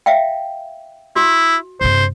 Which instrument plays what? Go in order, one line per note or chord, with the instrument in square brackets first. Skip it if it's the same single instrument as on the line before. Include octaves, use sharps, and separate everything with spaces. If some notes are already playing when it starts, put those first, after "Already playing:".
[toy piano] E5 F5 G5
[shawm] E4 [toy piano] F#4
[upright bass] G2 C3 [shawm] C5